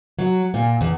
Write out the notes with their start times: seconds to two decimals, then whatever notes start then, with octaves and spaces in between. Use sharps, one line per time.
0.19 F#3
0.54 A#2
0.81 E2